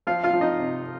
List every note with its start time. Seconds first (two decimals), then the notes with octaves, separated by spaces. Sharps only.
0.07 F3 F4 F5
0.24 F4 F5
0.33 F3
0.41 D#4 D#5
0.59 C3